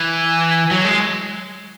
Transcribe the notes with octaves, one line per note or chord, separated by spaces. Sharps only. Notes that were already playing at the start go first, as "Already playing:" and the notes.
Already playing: E3
F#3
G#3